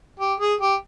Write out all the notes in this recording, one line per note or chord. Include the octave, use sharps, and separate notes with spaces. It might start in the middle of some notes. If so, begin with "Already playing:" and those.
G4
G#4
G4